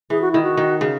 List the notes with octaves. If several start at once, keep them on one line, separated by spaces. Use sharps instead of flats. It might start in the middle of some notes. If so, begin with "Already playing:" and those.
E3 G#4
F#4
D#3 E4
F#4
D#3
C#3